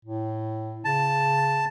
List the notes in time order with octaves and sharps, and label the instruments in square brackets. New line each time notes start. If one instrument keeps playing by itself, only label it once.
[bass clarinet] A2
[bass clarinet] C#3 [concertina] A5